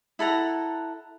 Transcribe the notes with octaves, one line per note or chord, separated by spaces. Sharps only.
E4 A4 F#5 A#5